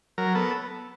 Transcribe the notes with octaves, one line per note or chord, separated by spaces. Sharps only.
F#3 A#4
B3 A4